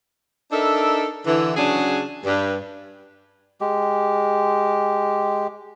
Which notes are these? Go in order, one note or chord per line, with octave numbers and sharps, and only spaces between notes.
D4 D#4 A4 A#4 E5
D3 E3
C#3 F#3 C#4 D4 G#4
G2
G#3 G4